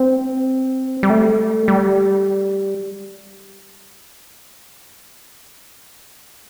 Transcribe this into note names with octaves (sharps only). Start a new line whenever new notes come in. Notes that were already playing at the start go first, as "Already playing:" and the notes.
Already playing: C4
G3
A3
G3